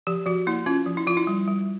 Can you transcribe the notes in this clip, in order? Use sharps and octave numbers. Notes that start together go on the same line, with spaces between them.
F3 G4
F3 F#4
A#3 E4
C#4 F4
F3
E4
F3 F4
E4
G3
G3